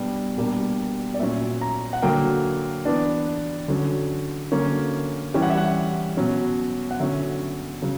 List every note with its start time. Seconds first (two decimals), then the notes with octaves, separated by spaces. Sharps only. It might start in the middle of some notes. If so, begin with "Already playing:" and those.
Already playing: B2 G3 B3 D4
0.37 B2 G3 A#3 D4
1.14 D5
1.20 A#2 F#3 C#4 E5
1.61 A#5
1.93 F#5
2.02 D3 F#3 A#3 G5
2.85 E3 B3 D4
3.68 D3 F#3 C#4
4.52 D3 F#3 A#3 C#4
5.34 E3 G3 C#4 G5
5.42 F#5
5.50 E5
5.57 F#5
6.17 B2 F#3 C#4
6.91 F#5
7.00 D3 F#3 C#4 E5
7.82 C#3 F#3